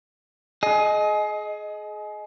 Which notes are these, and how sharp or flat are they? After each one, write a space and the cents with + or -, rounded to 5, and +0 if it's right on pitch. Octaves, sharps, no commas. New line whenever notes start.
G#4 +30 D#5 +0